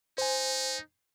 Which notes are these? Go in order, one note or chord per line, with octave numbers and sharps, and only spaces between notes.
D#4 C5 G#5